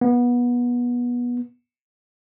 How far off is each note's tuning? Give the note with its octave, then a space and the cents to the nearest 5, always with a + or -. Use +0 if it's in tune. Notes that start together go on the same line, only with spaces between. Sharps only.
B3 -25